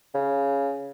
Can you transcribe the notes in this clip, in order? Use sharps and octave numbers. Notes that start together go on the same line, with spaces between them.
C#3